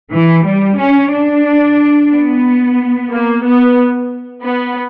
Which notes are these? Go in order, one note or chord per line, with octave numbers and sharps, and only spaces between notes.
E3
G3
C#4
D4
B3
A#3
B3
B3